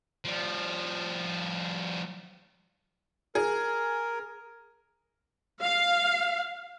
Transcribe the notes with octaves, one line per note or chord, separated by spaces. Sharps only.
F3 G3
G#4 A#4
F5